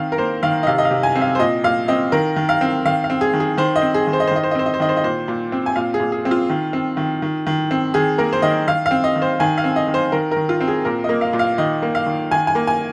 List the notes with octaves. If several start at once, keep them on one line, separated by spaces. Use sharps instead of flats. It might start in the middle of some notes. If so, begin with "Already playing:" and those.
Already playing: D#3 C4 F5
A#4
A#3 C5
D#3 F5
D#5
C3 F5
D#5
F5
C3
G#5
C4
F5
C5
A#2 D#5
A#2 F5
C4 D#5
D#3 A#4
D#3
F5
C4
D#3 F5
F5
C4
G#4
D#3
G#4
D#3 C5
D#5
C4
G#4
D#3
C5
D#5
C5
D#3 D#5
C5
D#5
C4 C5
D#5
C5
D#3 D#5
C5
D#5
A#2 C5
A#2
C4
G#5
A#2 F5
G#4
A#2
G#4
C4
F4
D#3
C4
D#3
D#3
D#3
C4
D#3 G#4
A#3 A#4
C5
D#3 D#5
D#3 F5
F5
C4
D#5
D#3
C5
D#3 G#5
F5
C4
D#5
D#3
C5
D#3 A#4
D#3 A#4
F4
C4
G#4
A#2 A#4
A#3 D#5
F5
A#2
F5
D#3 D#5
A#3
F5
D#3
D#3 G#5
G#5
A#3
G#5